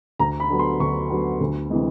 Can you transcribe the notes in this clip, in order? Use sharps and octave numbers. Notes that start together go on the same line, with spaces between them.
D2 A#5
B5
D3 F#3 B3
C6
D2 C#6
D3 F#3 B3
D2
C3 E3 G#3